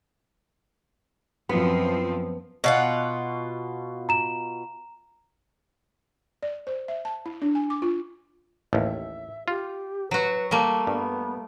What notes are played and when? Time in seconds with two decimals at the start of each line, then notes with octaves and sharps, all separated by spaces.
1.49 F#2 F3 B3 C4
2.64 B2 F4 D#5 F#5
4.09 A#5 E7
6.43 D5
6.67 C5
6.88 E5
7.05 A5
7.26 E4
7.42 D4
7.55 G#5
7.70 D6
7.82 F4
8.73 A1 D#2 E5
9.48 F4 G4
10.11 F#3 F#4 B4
10.51 G3 A3 A#3 F5
10.87 G2 B3